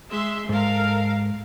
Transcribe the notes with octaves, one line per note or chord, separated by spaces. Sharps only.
G#3 E5 C6
G#2 A4 A#4 F5